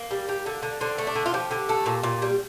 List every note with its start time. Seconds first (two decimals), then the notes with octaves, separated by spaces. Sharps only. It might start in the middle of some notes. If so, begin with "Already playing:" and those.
Already playing: A#3
0.11 G3
0.29 G3
0.46 D3
0.63 D3
0.81 D3 C4
0.98 A3
1.07 D4
1.15 D3
1.26 F4
1.34 F3 G4
1.51 D3
1.69 A3
1.86 A#2
2.03 A#2
2.22 G3